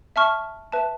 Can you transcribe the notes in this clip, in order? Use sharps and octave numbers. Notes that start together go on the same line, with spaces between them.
E5 A5 C#6 F6
B4 E5 A5